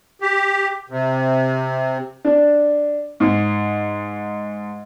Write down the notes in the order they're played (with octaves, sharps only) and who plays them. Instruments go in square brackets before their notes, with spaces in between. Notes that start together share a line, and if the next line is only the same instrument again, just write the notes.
[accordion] G4
C3
[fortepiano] D4
G#2